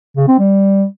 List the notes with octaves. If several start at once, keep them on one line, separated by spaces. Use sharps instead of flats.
C#3
C4
G3